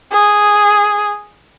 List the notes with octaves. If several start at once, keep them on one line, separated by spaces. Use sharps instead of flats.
G#4